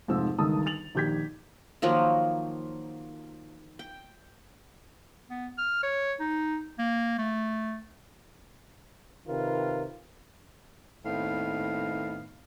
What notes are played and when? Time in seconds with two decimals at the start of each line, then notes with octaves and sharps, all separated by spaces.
0.08 F1 G#2 F3 C4 C5 E6
0.38 G1 C#2 D#3 A5 D#6 E6
0.66 A6 F7 F#7
0.95 A#1 D#3 G4 G6 G#6 B6
1.82 D#3 F3 F#3 A#3
3.79 G5
5.30 B3
5.58 F6
5.83 C#5
6.20 D#4
6.78 A#3
7.19 A3
9.28 C3 D#3 F4 A#4 B4
11.05 D#2 A2 D#3 B3 C4 F5